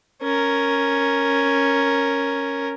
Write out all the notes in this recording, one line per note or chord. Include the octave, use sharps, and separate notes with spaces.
C#4 A#4